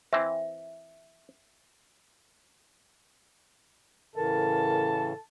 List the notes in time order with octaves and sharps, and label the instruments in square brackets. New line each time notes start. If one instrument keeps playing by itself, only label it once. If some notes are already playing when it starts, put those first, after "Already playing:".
[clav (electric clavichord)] E3 C4 [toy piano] E5
[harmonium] A2 C#3 E3 [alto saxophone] A4 [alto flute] A#4 [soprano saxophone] A5